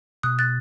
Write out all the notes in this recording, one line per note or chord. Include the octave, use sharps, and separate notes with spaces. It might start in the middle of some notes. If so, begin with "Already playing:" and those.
B2 D#6 F#6
F#6 A6